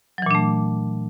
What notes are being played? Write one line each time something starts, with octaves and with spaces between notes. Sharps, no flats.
A#2 E3 F#3 A3 D4